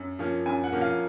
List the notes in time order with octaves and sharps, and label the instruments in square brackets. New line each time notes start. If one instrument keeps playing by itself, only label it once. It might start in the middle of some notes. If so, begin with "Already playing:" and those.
Already playing: [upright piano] F#2
F3 A#3 C#4
F#2 G#5
F#5
F3 A#3 C#4
F5